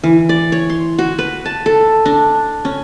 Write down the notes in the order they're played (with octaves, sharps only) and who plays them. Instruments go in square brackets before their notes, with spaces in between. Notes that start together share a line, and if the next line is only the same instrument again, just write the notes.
[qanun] E3
D5
C#5
C6
F#4
B4
A5
A4
D4
C#4